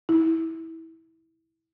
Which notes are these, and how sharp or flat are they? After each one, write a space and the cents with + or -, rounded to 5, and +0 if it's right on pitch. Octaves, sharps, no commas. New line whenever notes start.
E4 -20